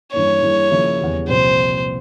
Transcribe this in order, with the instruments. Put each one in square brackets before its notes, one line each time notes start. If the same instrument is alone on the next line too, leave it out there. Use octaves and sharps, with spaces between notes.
[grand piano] G2 E3 A#3 C#4 [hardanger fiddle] C#5
[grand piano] G2 E3 A#3 E4 G#4
C#3 F3 A#3 E4 G#4
E2 C#3 G3
[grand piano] C2 A#2 F3 C4 G4 [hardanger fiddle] C5